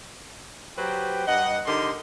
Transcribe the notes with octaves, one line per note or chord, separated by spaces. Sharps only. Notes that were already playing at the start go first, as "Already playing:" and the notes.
F#3 G4 B4 C5 G5
G2 D#5 F#5
D3 D#4 G4 A#4 D#5 C6